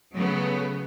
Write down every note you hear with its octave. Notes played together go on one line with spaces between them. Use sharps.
C#3 F#3 A3 B3